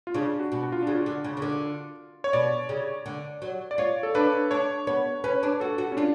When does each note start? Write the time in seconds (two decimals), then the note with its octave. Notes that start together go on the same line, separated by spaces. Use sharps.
0.07 F4
0.14 C#3 D4
0.39 F#4
0.52 B2
0.63 F#4
0.72 F4
0.83 D4
0.87 C#3
0.91 F4
1.06 D3
1.24 C#3
1.37 C#3
1.42 D3
2.24 C#5
2.33 B2 D5
2.69 C#3
3.06 D3
3.42 F#3
3.71 D5
3.78 F4 C#5
4.03 A4
4.15 D4 B4
4.51 D4 C#5
4.87 B3 C#5
5.24 C#4 B4
5.43 D4
5.60 F#4 A4
5.78 F#4
5.92 C#4
5.97 D4 F4